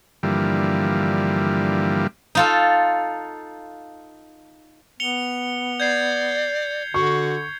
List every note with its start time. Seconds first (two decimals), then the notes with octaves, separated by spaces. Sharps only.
0.23 G2 D3 E3 F3 G3 A#3
2.35 D#4 F4 A4
5.00 B3 C#7 F7 G7
5.80 D5 G6 G#6 C7
6.94 D3 F#4 C#6